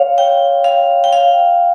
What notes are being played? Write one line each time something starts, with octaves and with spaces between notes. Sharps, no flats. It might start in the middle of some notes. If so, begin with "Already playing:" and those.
Already playing: C#5 F5
G5
F5
G5
F5